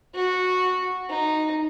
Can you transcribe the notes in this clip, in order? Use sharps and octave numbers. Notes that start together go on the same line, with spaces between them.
F#4
D#4